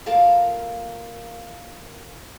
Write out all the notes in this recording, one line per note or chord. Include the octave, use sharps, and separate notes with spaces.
A#3 F4 A4 A#4 F5